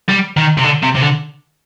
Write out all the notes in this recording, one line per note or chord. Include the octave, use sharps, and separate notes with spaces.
G3
D#3
C3
D3
C3
C3
D3